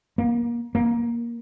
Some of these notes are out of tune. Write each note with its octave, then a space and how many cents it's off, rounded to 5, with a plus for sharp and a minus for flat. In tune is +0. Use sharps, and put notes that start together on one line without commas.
A#3 +25
A#3 +15